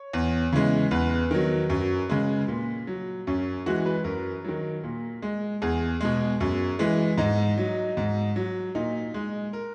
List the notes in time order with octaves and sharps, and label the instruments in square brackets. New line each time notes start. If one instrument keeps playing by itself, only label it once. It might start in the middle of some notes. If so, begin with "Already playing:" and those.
Already playing: [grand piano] C#5
E2
C#3 E3 G#3
E2 B4
D#3 F#3
F#2
C#3 G#3
A#2
F#3
F#2 C#4
E3 G#3 F#4
B4
F#2 A#4
D#3 F#3
A#2
G#3
E2 G#4
B2 G#3
F#2
E3 G#3
G#2 D#4
F#3
G#2
F#3
A#2 D#4
G#3
A#4